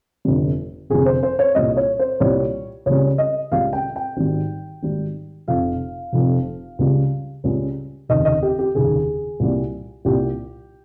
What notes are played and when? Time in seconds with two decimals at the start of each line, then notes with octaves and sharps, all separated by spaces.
0.25 G1 F2 C3 G3
0.90 G1 F2 C3 G3 G#4
1.06 C5
1.23 C5
1.39 C#5
1.55 C2 A#2 G3 D#5
1.77 C#5
1.99 C5
2.20 C2 A#2 G3 C#5
2.86 C#2 C#3 G3 C#5
3.18 D#5
3.51 C#2 C#3 G3 F5
3.73 G5
3.96 G5
4.17 G#1 G#2 G3
4.83 G#1 G#2 G3
5.48 F1 F2 C3 F5
6.13 F1 F2 C3
6.79 C#2 C#3 G3
7.44 C#2 C#3 G3
8.09 F1 D#2 C#3 D#5
8.25 D#5
8.43 G4
8.59 G4
8.74 F1 D#2 C#3 G#4
9.40 C2 A#2 G3
10.05 C2 A#2 G3 G4